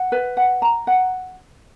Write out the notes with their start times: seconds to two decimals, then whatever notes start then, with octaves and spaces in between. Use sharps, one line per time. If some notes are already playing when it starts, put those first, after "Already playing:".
Already playing: F#5
0.12 B4
0.37 F#5
0.62 A#5
0.87 F#5